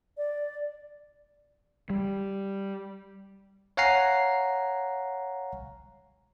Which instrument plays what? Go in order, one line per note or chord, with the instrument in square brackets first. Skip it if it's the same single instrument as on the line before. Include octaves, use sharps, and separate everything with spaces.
[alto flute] D5
[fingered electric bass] G3
[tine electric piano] C#5 F5 F#5 G#5 A#5 C7